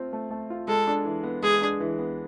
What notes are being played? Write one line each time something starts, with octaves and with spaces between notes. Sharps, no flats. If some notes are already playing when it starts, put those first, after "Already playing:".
Already playing: A3 C4 F4
A3
A3
F4
G#3 A4
D4
E3
B3
G#3 G#4
D4
E3
B3